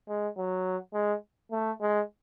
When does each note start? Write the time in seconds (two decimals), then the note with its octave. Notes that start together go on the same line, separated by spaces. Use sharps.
0.08 G#3
0.37 F#3
0.94 G#3
1.51 A3
1.81 G#3